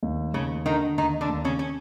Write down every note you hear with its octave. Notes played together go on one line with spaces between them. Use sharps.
D#2
D#2 C#3 C#4
D3 D#3 D#4
D#2 D#3 D#4
D3 D4
D#2
C#3 C#4
C#4